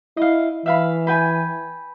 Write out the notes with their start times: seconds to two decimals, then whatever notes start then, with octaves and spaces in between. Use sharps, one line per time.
0.17 E4 D#5 F5
0.66 E3 E5 F5 B5
1.07 B4 G5 G#5